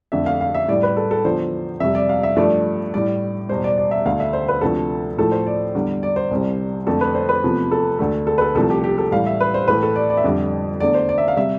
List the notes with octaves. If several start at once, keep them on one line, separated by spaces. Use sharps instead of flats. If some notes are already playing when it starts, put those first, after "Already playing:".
F2 D3 A3 E5
F5
F5
E5
A2 G3 D5
B4
A4
A4
E2 D3 F3 C5
F2 C3 G3 E5
D5
F5
E5
G2 F3 A3 D5
A2 G3 D5
E2 B2 G3 C5
D5
D5
E5
D2 D3 A3 F5
E5
C5
B4
D2 C3 F3 A3 A4
A2 F3 A3 A4
C5
D5
E2 D3 G3
D5
C5
C2 C3 G3
F2 D3 A3 A4
B4
C5
B4
E2 C3 F3 A3
A4
D2 D3 A3
A4
B4
A4
C2 C3 F3 A3 A4
G4
G4
A4
A2 E3 G3 F5
E5
B4
C5
A2 E3 A3 B4
A4
D5
D5
E5
F2 D3 G3 D5
E2 D3 A3 D5
C5
D5
E5
F5
C3 G3 E5